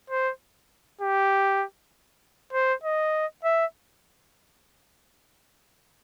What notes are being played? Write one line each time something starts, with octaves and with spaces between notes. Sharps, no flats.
C5
G4
C5
D#5
E5